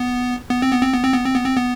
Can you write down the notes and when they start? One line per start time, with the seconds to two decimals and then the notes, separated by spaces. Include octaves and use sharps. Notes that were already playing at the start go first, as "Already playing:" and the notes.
Already playing: B3
0.51 B3
0.62 C4
0.73 B3
0.82 C4
0.94 B3
1.04 C4
1.13 B3
1.25 C4
1.35 B3
1.45 C4
1.56 B3